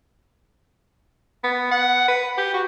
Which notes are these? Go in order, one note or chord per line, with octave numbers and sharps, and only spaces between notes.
B3
F#5
B4
G4
F#4